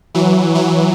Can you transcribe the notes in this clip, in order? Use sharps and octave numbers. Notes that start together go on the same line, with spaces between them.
E3 F#3
E3 F#3